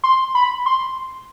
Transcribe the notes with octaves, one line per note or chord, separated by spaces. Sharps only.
C6
B5
C6